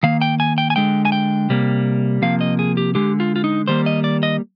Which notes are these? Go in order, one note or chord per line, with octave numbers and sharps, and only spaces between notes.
D#3 A#3 F5
G5
G#5
G5
G#5
D3 G#3 G5
G#5
G5
C3 G3 A#3
C3 F3 A#3 F5
D#5
G#4
G4
D3 G#3 G4
F4
F4
D#4
D#3 G3 A#3 C5
D#5
D5
D#5